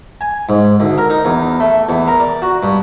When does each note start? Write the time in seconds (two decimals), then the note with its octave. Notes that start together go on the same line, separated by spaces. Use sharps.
0.21 G#5
0.49 G#2
0.80 D2
0.98 A#4
1.10 D#4
1.25 E2
1.60 A3
1.89 E2
2.08 A#4
2.20 D5
2.42 F#4
2.63 G2